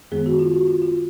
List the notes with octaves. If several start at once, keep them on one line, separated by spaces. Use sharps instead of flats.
F#2 D#3 G#3 B3 G#4
F#4
F4
F#4
F4
F4